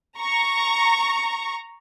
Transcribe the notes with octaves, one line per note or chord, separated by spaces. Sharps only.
A#5 C#6